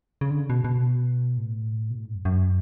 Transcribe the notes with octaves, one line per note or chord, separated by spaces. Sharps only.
C#3
D3
C#3
B2
B2
A2
B2
A2
G#2
F#2
F#2